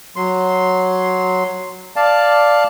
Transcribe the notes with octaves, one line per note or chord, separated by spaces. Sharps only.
F#3 C6
D5 F5 A5